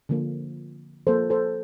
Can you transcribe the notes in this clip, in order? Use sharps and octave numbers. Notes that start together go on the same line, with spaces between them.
D3 F3 A#3
F3 A#3 A4 C5
A4 C5